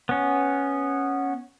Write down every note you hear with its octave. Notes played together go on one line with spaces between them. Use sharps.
B3 C#4